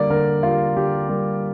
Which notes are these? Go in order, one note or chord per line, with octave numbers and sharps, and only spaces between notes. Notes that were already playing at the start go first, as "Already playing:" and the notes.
Already playing: D3 G3 A#3 D5
D3 A#4
G3 A#3 F4
D3 G4
G3 A#3